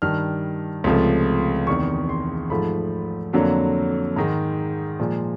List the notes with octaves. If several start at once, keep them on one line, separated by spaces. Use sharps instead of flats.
G2 D#3 G3 F6
C#2 C3 F3 A3
E2 C3 D#3 C#6
C6
G#2 F3 A3 B5
F2 D3 F#3 A#3
G#2 D#3 G#3 A#5
A#2 F3 G#3